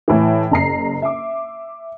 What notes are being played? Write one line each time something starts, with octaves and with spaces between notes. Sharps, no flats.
A2 E3
F#1 A#5 C7
E5 D6